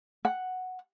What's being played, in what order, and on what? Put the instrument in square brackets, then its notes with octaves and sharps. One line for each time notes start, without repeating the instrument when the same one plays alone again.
[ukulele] F#5